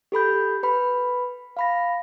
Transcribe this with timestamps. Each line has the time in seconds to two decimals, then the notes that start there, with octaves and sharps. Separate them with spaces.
0.12 G4 A4 B5 G6
0.63 B4 B5
1.57 F5 B5 A#6